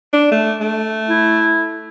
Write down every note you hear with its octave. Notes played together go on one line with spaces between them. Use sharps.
D4
A3
A3
E4